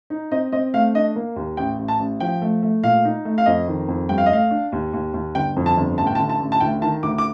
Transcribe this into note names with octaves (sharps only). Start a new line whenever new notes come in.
D#4
C4 D#5
C4 D#5
A3 F5
D4 D#5
A#3
D#2
A1 G5
A1
A5
A1
F3 G5
A3
A3
A#2 F5
D#4
A3
F5
F2 D#5
D#3
F2
G2 G5
F5
D#5
A3 F5
D4
D#2
D#2
D#2
G1 G5
F2
A5
G1
A1 A5
G5
A5
D3
A5
A1
A5
D2 G5
D#3 A5
D2 D6
D6